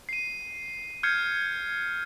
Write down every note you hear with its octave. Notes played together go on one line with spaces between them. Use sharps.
C7 D#7
F6 G6 G#6 C7 C#7